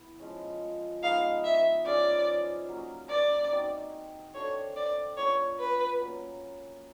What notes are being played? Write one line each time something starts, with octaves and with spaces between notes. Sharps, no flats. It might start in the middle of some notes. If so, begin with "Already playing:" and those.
Already playing: B3 E4
F3 G#3 C#4
F3 G#3 B3 D#4 F5
E5
C#4 F4 G#4 C5 D5
F#3 A#3 C#4
D5
C4 D#4 F#4
D4 F#4 A4 C5 C#5
D5
B3 D4 F4 A#4 C#5
B4
F#3 A#3 C#4